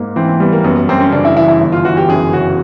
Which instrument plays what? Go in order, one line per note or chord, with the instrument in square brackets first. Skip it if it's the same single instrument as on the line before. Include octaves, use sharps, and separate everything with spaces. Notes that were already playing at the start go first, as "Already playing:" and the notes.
Already playing: [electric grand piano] G#2 A#3
[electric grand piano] E3 [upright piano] C4
[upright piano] C4
[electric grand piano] G3 [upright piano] B3
[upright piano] A#3
[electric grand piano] F#2 [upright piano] B3
[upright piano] B3
[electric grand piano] F#2 [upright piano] C4
[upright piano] C#4
[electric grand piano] C#3 [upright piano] D4
[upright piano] E4
[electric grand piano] E3 [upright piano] E4
[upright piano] E4
[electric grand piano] G1
[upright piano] F4
[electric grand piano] E3 [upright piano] F#4
[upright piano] G4
[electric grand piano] F#2 [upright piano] G#4
[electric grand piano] C#3 [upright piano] F#4